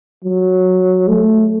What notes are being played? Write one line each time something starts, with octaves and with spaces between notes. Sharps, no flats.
F#3
A3